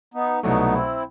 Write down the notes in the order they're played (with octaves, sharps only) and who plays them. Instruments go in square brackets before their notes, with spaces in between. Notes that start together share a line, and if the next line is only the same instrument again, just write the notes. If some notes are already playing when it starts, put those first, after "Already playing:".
[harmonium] B3 D#4
[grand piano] C2 B2 F#3 A3 [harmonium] B3 D#4
[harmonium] C4 E4